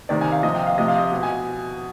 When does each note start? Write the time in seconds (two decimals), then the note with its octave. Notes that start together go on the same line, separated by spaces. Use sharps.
0.09 C3 D#3 D5
0.21 G#5
0.32 F5
0.43 C3 F3 D#5
0.55 G5
0.67 F5
0.78 C3 F3 D#5
0.88 F5
0.98 D#5
1.12 B2
1.23 G#5